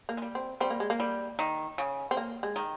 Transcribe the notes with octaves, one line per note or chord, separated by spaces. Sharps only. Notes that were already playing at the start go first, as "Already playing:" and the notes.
A#3
G#3
G3
C4
G3 C4
A#3
G#3
A#3
G3
D#3
C#3
C4
A#3
G#3
D#3